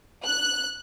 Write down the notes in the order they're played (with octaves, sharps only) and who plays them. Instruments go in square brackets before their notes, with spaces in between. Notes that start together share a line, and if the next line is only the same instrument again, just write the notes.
[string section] F#6